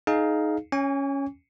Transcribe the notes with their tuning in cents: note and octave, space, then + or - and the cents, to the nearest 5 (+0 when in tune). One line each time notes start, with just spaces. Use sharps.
D#4 +0 G#4 +25 F5 +0
C#4 +0 G#5 -30 C#6 +40